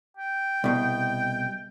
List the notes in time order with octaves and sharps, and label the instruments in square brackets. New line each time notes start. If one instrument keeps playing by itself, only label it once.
[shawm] G5
[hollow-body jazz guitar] C2 B2